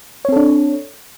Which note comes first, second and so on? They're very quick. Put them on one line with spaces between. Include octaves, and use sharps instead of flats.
C#5 C4 A4 D4